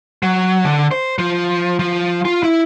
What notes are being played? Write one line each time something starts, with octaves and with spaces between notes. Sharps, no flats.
F#3
D3
C5
F3
F3
F4
E4